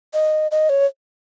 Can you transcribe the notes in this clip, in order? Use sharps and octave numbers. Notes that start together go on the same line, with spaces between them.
D#5
D#5
C#5